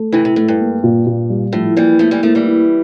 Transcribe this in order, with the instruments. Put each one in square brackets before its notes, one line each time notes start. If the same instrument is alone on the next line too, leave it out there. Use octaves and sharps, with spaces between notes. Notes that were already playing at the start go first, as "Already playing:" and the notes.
Already playing: [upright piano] A3
[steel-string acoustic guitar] C3 E3 [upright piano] E4
[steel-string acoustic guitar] C3
[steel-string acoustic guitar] A2 [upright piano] A3
[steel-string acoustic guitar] G2
[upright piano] A#3
A#2
A#2
G3
[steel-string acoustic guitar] A2 [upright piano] F3
[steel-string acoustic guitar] E3 G3 [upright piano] A#3
[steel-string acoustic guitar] F3 A3 [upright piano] A#3
[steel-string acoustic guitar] E3 G3
[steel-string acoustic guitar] F3 A3 [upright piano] A#3
[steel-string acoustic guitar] E3 G3
[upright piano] E4